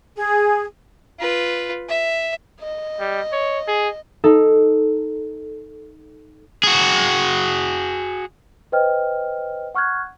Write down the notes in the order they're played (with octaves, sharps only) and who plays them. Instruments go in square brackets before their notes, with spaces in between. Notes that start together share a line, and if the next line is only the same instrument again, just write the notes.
[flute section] G#4
[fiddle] F4 B4
E5
[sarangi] D#5
[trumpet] G3
C#5
G#4
[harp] D#4 A4
[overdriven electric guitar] F#4 G#4
[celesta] B4 C5 D#5 G5 F6
F#5 C#6 F6 F#6 G#6